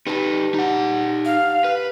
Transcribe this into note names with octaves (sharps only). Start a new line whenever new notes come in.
D#4 G4 B4 D5 A5
D#4 F#5
F5
B4